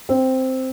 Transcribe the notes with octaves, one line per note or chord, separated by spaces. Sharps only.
C4